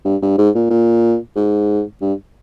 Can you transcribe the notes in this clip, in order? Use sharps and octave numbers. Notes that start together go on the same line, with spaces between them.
G2
G2
G#2
A#2
A#2
G#2
G2